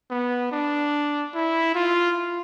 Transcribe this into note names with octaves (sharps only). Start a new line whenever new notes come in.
B3
D4
E4
F4